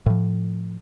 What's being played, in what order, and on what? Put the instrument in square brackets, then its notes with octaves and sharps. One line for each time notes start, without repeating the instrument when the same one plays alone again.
[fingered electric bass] A2 F3